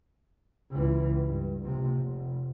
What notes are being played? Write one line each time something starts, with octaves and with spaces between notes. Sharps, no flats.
C#2 E3
G2
A#1 C3
F1